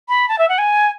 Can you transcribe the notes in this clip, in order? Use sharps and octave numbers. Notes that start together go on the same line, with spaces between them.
B5
A5
E5
F#5
G#5